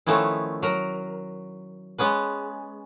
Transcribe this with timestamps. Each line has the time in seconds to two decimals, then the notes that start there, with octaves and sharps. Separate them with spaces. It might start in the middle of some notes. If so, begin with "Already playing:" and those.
0.07 D#3 F3 A3 B3 C#4 E4
0.62 F#3 A#4
1.98 G#3 B3 C#4 B4